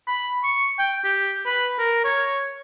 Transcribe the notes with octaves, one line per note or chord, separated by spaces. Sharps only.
B5
C#6
G5
G4
B4
A#4
C#5